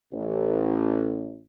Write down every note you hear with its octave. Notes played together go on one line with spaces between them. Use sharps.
A1